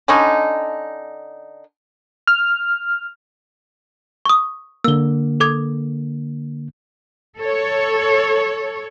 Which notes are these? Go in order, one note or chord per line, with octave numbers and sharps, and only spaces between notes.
D3 C#4 D#4
F6
C#6 D#6
D3 A#3 E6 G7
A4 D6 G#6
A4 C#5